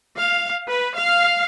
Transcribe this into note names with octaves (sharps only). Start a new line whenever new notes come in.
F5
B4
F5